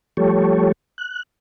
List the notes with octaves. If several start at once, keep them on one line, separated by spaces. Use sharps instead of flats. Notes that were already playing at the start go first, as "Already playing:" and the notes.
F3 G3 A3 G4 A4 C#5
F#6